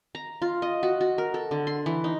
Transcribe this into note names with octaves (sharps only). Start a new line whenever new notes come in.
A#5
F4
D#5
F#4
F#4
A#4
A4
D3
C6
E3
D#4